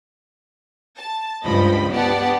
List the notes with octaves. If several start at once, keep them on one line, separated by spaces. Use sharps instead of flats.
A5
C#2 G2 F3 D#5 B5
B3 D4 G4 D5 F#5 A5